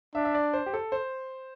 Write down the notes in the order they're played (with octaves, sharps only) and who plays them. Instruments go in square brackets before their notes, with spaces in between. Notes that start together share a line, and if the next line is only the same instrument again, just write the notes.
[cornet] D4 [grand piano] E5
[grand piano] E5
D5
C5
G4
A4
C5